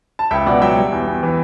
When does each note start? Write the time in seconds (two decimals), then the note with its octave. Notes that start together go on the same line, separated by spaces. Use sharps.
0.19 A5
0.31 C#2 E5 G5
0.46 B2 D5 F#5
0.62 F#3 E5 G5
0.77 G3
0.92 E2
1.07 E2
1.23 E3